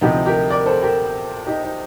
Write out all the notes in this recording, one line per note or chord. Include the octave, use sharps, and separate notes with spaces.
D2 C3 F3 D#4 G4
G4 A#4
A#4 D5
A4 C5
G4 A#4
D#4 G4
D#4